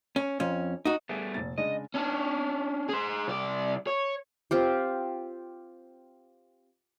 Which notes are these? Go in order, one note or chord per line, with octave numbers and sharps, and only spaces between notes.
C#4
F2 C#4
D#4 F#4
G3 A3 B3 G#4
F1 A#2 A6
C#3 G#3 D4 D#5
C#4 D4
G#4 C5
C2 D5
C#5
C4 F4 G4